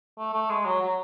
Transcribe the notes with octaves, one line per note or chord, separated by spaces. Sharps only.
A3
A3
G#3
F#3
F#3